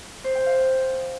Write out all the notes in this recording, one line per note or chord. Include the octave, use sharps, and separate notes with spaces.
C5
G5
F5